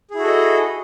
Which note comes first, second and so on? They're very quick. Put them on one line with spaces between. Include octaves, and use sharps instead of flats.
G#4 E4 F#4 A4 D#5